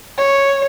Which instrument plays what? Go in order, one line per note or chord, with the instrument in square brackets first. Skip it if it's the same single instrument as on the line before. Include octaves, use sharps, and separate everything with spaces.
[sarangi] C#5